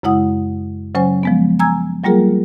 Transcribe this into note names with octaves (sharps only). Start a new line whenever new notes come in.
F#2 C#3 G#3 E4 F#5 D#6
C#3 F#3 C#4 C5 G#5
F3 G#3 B3
G#5 A#5 E6 G#6
F#3 G3 A#3 F4 G#4 A#4